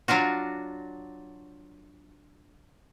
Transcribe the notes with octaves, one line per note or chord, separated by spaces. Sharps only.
F#3 D4 F4 F#4